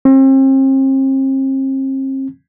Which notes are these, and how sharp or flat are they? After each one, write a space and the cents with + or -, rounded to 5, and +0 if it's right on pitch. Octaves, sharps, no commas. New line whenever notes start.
C4 +40